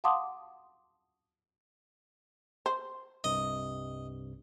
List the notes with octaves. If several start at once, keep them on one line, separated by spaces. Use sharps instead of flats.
F5 F#5 A5 C6 D6 D#6
C5
C2 G2 C3 D#5